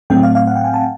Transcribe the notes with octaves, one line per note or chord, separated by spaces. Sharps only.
A2 F#3 A3 C4 G5
F5
F5
F#5
G5
G#5
A5